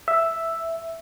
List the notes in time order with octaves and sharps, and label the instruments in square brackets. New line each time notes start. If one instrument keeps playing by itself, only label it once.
[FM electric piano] E5